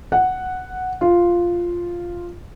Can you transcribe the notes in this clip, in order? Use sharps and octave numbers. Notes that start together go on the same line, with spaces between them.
F#5
F4